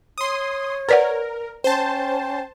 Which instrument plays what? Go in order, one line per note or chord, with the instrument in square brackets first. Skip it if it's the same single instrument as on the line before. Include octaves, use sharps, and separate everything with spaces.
[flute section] C#5 [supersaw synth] C6 D#6
[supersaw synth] A#4 [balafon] B4 D5 F#5
[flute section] C#4 G5 [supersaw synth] C5 A5